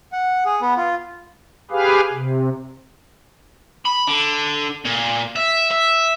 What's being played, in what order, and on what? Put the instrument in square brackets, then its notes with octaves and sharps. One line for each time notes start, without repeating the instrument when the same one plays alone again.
[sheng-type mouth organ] F#5
G#4
B3
F4
[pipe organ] G4 G#4 B4 F5
C3
[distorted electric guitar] B5
D3
A#2
E5
E5